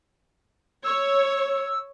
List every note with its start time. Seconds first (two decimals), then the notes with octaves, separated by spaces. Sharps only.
0.84 C#5 E6